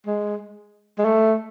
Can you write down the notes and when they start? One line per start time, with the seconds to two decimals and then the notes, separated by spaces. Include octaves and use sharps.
0.07 G#3
0.98 G#3
1.05 A3